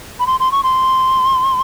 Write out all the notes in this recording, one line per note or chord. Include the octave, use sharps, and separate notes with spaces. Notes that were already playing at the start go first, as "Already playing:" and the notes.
B5
C6
C6
C#6
C6